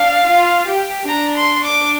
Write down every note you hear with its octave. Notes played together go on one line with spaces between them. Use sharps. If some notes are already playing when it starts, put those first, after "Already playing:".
Already playing: D4 F5
F4
G4
D4 A#5
C6
D6